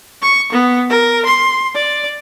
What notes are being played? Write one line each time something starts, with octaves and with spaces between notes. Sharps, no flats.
C#6
B3
A#4
C6
D5